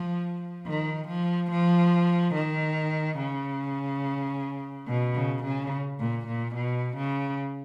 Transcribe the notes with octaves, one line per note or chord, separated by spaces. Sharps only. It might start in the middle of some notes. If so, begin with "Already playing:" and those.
Already playing: F3
D#3
F3
F3
D#3
C#3
B2
C#3
C#3
A#2
A#2
B2
C#3